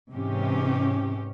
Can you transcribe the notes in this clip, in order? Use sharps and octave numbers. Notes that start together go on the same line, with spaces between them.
G#2 C3 E3 C#4 G4